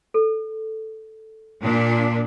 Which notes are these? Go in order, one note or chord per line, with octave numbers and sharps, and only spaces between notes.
A4
A#2 D4